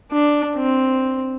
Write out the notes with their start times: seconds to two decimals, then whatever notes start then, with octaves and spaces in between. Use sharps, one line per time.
0.11 D4
0.56 C4